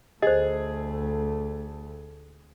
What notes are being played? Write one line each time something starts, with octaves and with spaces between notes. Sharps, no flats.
D2 A3 G#4 C5 D#5